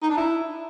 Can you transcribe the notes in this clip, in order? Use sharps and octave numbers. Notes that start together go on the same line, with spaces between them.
D#4
D4
E4